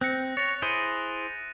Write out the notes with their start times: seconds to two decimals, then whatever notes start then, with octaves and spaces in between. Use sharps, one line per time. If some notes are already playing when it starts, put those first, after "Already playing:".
0.01 C4 F#6 A#6 C#7
0.37 C#5 A6 A#6 F7
0.62 E4 G#4 C5 D#7